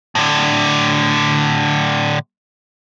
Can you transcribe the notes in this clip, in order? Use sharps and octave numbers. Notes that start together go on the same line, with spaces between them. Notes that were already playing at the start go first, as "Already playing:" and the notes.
A2 D3